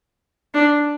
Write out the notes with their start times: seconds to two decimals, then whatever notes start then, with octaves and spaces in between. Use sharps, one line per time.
0.54 D4